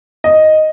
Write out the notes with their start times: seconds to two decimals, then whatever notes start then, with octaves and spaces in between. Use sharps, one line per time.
0.24 D#5